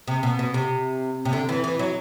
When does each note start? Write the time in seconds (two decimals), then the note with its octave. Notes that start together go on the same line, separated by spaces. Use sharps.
0.07 C3
0.23 B2
0.39 B2
0.54 C3
1.25 C3
1.33 D3
1.49 E3
1.64 E3
1.79 F#3